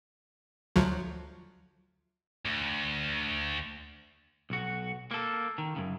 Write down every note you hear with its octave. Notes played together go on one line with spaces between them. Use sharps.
D2 F3 F#3
D2
B1 F#4
A#3 A4
D#3
F#2 C#3